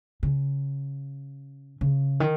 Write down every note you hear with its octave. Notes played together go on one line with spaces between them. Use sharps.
C#3
C#3
D#3